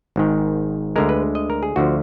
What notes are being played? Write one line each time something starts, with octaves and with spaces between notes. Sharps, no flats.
G#1 G#2 D#3
D2 D3 G#3 A#4
B4
D#5
A#4
G#4
D2 D3 F3 F#4